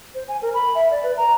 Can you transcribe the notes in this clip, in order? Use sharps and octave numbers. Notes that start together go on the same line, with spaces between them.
C5
G#5
A#4
B5
E5
D5
B4
A#5